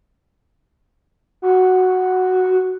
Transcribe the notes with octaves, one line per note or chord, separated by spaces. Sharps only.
F#4